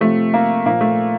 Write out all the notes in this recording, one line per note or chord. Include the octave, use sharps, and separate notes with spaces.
C3 F3 A3
A#3
A#2 F3 A#3
A3